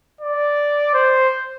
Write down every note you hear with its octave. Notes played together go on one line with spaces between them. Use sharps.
D5
C5